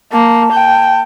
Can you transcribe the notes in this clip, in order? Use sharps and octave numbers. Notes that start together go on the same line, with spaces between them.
A#3 A5
G5